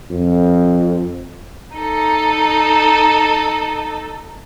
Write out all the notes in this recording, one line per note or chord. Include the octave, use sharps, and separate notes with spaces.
F2
D#4 A4